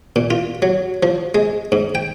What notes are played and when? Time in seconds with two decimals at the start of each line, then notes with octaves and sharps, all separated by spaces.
0.16 A#2
0.30 F4
0.62 F#3
1.03 F3
1.35 G#3
1.72 G#2
1.95 G5